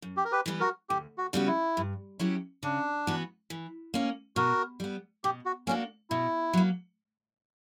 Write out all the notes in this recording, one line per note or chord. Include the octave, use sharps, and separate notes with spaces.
F#2
G4
A#4
G4 B4
E3 G3 B3
F#4 A#4
D2 G4
F#4
C#3 G3 B3 F#4
E4
G2
F#3 C#4 E4 G4
C#3 D4
E3 B3 F#4
E3
A#3 C#4
B2 F#4 A#4
G3 B3
B2 G4
F#4
A#3 C#4 D4 F#4
B2 E4
F#3 A#3